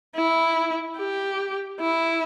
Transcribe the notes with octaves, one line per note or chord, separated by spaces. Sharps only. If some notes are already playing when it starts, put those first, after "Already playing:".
E4
G4
E4